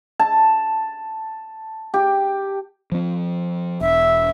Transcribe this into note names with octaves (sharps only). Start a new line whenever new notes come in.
A5
G4
F3 C4
E1 E5